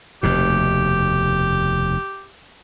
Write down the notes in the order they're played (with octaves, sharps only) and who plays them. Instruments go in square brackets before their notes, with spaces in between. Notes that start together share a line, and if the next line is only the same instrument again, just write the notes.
[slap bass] F1 D#2 B2 [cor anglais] G4